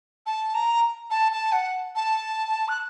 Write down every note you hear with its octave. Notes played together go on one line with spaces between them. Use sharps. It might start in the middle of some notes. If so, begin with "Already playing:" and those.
A5
A#5
A5
A5
F#5
A5
F#6